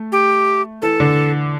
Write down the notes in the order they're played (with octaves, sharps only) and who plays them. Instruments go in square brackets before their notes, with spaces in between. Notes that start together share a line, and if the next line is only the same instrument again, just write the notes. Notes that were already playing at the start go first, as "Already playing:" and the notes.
Already playing: [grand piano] A3
[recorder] G4
[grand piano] E3 [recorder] A4
[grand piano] D3